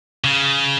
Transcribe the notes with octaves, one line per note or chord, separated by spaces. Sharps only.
C#3